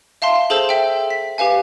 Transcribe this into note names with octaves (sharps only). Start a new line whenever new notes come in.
E5 F5 A5 C6
G#4 A4 C5 A5 E6 G6
A4 E5 G5
B6
G4 B4 F5 G#5